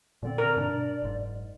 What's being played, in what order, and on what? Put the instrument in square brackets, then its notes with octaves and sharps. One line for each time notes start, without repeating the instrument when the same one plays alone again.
[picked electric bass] A#2 D3 C4 [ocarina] D5
[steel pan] A#4
[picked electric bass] G2 B2 D4
F#1 G#2